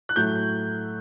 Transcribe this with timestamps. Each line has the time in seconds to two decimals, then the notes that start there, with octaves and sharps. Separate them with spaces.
0.09 F#6
0.16 A2 F#3 A3 G6